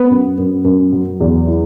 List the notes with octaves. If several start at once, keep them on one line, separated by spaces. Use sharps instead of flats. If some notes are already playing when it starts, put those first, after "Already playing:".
Already playing: B3
F#2
F#2
F#2
F#3
E2
E4